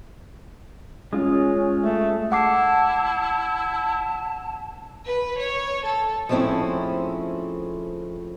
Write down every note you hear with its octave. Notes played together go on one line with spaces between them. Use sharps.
G#3 C#4 F4 F5
A3
E4 F#5 A5 D6 C7
B4
C#5
A4
F3 G#3 A3 C4 C#4 E4